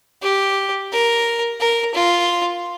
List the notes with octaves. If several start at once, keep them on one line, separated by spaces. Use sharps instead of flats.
G4
A#4
A#4
F4